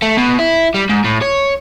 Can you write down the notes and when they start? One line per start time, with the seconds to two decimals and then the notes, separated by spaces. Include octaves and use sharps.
0.02 A3
0.17 B2
0.39 E4
0.74 G3
0.90 G#2
1.05 A2
1.22 C#5